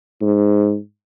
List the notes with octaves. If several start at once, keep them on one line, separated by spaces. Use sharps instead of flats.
G#2